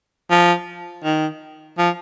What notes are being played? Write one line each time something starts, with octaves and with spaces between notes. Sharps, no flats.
F3
D#3
F3